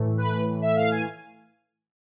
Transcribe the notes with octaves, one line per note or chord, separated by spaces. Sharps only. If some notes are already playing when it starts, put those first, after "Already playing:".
Already playing: A2 E3 A3
B4
E5
F5
G#5